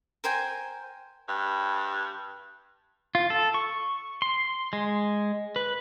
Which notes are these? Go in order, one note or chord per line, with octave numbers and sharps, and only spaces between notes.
A#4 C5 G5 G#5
G2
F4
A4
C#6
C6
G#3
B4